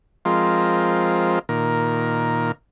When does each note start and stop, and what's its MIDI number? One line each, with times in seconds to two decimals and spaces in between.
0.25 1.39 53
0.25 1.39 56
0.25 1.39 60
0.25 1.39 65
0.25 1.39 70
1.49 2.52 46
1.49 2.52 51
1.49 2.52 70